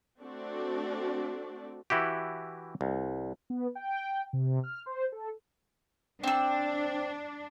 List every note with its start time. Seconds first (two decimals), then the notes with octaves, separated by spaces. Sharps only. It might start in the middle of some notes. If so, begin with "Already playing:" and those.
0.19 A3 C4 D4 F#4 D5
1.90 E3 E4 F#4 G4
2.81 C2
3.50 B3
3.75 G5
4.33 C3
4.64 F6
4.86 C5
5.12 A4
6.24 C4 D4 E6